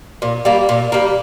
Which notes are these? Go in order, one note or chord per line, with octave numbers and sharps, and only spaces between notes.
A#2
G3 A#3
A#2
G3 A#3